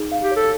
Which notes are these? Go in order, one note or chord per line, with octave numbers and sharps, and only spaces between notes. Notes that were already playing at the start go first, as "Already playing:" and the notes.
Already playing: D#4 G#4
F5
G4
A4 C#5